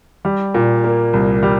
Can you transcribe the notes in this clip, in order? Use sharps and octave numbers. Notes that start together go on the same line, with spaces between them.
G3
A#2
A#3
C2
G3